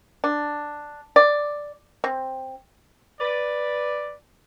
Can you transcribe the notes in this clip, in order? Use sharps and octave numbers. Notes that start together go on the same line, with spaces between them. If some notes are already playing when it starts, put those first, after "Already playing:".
D4
D5
C4
B4 D5